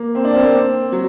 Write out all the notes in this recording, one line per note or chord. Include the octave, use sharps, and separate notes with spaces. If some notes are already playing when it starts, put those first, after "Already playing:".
Already playing: A#3
C4
D4
C4
A#3
C4
F#3